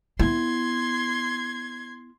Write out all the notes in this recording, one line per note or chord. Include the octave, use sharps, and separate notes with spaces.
B3 E4 C6 G#6